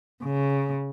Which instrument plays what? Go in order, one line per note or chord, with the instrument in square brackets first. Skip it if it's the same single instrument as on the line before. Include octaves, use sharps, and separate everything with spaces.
[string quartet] C#3